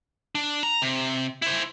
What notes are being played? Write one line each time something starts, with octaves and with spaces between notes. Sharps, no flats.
D4
A#5
C3
E4 C5